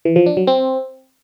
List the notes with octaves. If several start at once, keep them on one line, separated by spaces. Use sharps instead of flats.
E3
F3
D4
F#3
C4